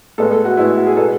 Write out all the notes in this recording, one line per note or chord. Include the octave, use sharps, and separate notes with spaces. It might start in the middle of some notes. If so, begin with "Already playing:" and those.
A2 G#3 B3 A4
A4
F#4
A2 G#3 B3 E4
F#4
G#4
B2 G#3 B3 A4